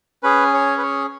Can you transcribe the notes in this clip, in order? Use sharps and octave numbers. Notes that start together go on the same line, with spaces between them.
C#4 G#4 B4
C#5
B4
C#5